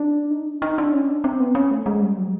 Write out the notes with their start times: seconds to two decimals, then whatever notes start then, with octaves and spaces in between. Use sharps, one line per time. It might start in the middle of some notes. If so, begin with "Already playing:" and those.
Already playing: D4
0.31 D#4
0.46 D4
0.62 D#4
0.78 D4
0.93 C#4
1.09 D4
1.24 C4
1.40 B3
1.55 C#4
1.71 A3
1.86 G#3
2.02 G3
2.18 F#3